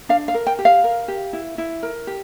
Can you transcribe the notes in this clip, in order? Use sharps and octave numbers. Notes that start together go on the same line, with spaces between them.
D4 F5
F5
A#4
G5
G4
F5
A#4
G4
E4
E4
A#4
G4